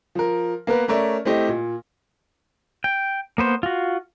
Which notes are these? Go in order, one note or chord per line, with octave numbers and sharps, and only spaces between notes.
F3 A#4
A#3 B3 A#4 B4
A3 C#4 A#4 C#5 D5 E5
A3 C4 E4 G4 D#5
A#2
G5
A#3 B3 C5
F4 F#4